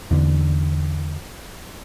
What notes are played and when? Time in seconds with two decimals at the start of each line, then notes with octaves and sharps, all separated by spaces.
0.11 E2 D3